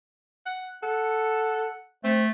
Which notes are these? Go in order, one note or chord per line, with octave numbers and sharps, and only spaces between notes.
F#5
A4 F#5
A3 C4